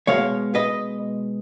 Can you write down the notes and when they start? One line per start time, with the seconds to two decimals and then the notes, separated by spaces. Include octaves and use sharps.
0.07 B2 G#3 C#5 F5
0.55 B4 D#5